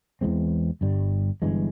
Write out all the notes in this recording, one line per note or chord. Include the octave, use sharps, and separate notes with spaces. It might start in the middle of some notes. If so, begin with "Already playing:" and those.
E2 E3 G#3 C4
G1 G2 G3
G1 G2 E3 G#3